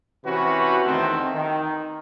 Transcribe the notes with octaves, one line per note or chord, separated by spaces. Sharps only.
C3 E3 C#4 F#4 B4
E2 D#3 A3 C4
D#3